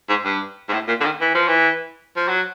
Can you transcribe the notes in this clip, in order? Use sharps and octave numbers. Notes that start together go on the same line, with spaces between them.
G#2
G2
G#2
A2
A#2
D3
D#3
E3
F3
E3
F3
F#3